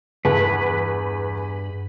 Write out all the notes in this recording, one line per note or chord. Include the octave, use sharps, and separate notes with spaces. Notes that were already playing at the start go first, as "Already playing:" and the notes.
E2 G2 B4